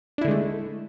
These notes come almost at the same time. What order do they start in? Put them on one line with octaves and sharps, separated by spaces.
D4 E4 D3 G#3 A3